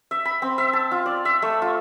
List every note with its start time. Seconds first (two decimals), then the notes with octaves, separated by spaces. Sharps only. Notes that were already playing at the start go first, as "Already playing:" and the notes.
0.11 E5
0.25 B5
0.42 C4
0.58 E5
0.73 A5
0.91 F4
1.06 D5
1.25 E5
1.42 A3
1.62 F4